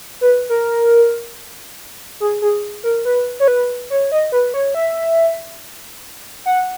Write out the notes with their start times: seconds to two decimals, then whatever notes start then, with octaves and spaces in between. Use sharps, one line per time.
0.21 B4
0.49 A#4
2.20 G#4
2.42 G#4
2.84 A#4
3.05 B4
3.40 C#5
3.48 B4
3.90 C#5
4.12 D#5
4.32 B4
4.54 C#5
4.75 E5
6.46 F#5